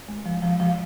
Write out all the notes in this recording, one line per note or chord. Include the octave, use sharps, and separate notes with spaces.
G#3
F3
F3
F3